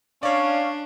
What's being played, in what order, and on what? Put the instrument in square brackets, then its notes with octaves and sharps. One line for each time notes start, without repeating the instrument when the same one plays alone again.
[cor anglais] C#4 [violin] D4 [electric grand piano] C#5 D5 [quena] F5